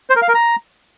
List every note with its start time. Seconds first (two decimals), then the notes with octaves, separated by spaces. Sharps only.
0.10 C5
0.16 A#4
0.22 F5
0.28 A#4
0.34 A#5